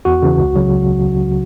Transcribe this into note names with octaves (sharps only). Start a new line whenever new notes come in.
E2 F#4
C#3 E3
C#2
C#3 F#3